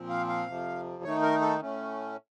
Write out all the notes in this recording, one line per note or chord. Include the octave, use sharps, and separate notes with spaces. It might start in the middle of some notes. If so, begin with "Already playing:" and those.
Already playing: A#2 F3 C4
F5
F5
F2 C3 F3
D#3 A3 D#4 C#5
A#4
A4
A2 A3 C#4